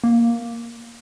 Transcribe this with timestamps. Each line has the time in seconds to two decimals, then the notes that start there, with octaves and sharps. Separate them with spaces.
0.04 A#3